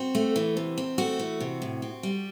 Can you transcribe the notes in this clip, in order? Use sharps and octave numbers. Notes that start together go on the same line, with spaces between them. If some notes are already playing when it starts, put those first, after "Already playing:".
Already playing: C4 F#4
A3
E3
C3
C4
A3 F#4
E3
C3
A2
C4
G3